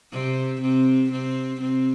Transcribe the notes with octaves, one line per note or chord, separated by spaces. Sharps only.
C3 C4
C3 C4
C3 C4
C3 C4